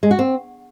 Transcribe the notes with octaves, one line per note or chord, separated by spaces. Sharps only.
G#3
F#4
C4